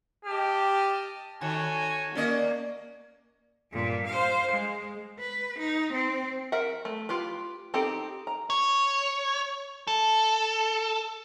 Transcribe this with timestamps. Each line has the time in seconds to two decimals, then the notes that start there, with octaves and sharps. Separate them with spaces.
0.25 G4 D#5 A5 F6
1.41 D#3 F#4 A4 C#5 G#5
2.15 A#3 C#4 D5 D#5
3.71 G2 A#2
4.06 C5 F5
4.51 G#3
5.19 B4
5.59 D#4
5.93 C4
6.52 A#4 E5 F#5
6.85 A3
7.09 F4 G4 B4
7.74 C4 D#4 G4 A4
8.27 A#5
8.50 C#5
9.87 A4